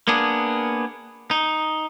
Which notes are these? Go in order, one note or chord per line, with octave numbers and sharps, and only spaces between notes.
A#3 B3 D4 G#4
D#4